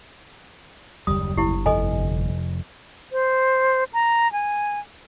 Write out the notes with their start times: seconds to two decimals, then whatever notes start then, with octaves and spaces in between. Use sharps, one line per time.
1.07 F#1 D#2 G3 D#6
1.37 G1 E4 G4
1.66 F1 C3 A4 D#5 G#5
3.12 C5
3.94 A#5
4.32 G#5